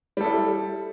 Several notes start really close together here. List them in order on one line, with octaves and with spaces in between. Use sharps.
G3 A4 E4